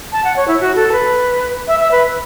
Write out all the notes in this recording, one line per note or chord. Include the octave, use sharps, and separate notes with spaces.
A5
F#5
C#5
E4
F#4
A4
B4
E5
E5
B4